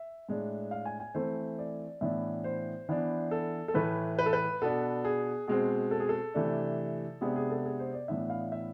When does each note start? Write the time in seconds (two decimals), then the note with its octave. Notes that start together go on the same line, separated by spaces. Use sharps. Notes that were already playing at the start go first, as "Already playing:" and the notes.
Already playing: E5
0.29 A2 G#3 D4
0.71 F5
0.86 G#5
1.00 G#5
1.15 E3 A3 C4 C5
1.59 D5
2.01 A2 E3 B3 D4 E5
2.44 C5
2.89 E3 B3 D4
3.31 A4
3.68 A4
3.74 A2 E3 A3 B4
4.19 B4
4.26 A4
4.33 B4
4.62 B2 B3 D4 A4
5.05 G#4
5.48 B2 G#3 C4 G#4
5.91 A4
6.00 G#4
6.09 A4
6.34 C3 E3 A3 D4
7.21 C3 G#3 B3 D4 G#4
7.36 G#4
7.50 A4
7.65 G#4
7.79 C5
7.94 D5
8.08 A2 E3 B3 D4 E5
8.30 F5
8.52 E5